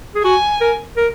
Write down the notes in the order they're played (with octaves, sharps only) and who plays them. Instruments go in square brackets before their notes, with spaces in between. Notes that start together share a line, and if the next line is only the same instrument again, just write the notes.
[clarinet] G#4
[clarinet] F#4 [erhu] G#5
[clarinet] A#4
A#4